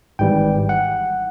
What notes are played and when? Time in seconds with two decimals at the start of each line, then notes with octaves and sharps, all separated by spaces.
0.19 G#1 G#2 E3 G3 G5
0.69 F#5